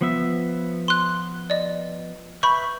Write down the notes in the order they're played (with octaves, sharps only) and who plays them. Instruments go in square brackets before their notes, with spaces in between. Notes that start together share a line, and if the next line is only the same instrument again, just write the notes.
[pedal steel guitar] F3 B3 E5
[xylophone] C6 F#6
D5 D#5
[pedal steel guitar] B4 E5 G6 [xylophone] B5 C#6